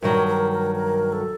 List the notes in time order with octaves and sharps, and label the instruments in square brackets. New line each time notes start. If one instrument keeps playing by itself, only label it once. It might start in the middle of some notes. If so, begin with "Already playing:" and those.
[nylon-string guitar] G2 D#3 F#3 [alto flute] A#4
[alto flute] A#4
A#4
A#4
A4